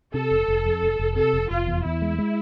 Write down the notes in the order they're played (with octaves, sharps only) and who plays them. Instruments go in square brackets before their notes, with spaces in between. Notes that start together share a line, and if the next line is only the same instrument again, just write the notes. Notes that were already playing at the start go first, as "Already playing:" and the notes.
[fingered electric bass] C3 [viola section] A4
[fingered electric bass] F1
F1
F2
F1
F1
[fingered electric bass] C3 [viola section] A4
[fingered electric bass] F1
[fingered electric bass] F1 [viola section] F4
[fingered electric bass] E2
[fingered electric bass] E2 [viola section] E4
[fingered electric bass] G#3
G#3